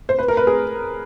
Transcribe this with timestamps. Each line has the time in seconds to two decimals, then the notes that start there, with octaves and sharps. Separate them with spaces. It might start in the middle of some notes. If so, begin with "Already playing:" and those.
0.09 C5
0.19 B4
0.28 A#4
0.37 B4
0.47 G#4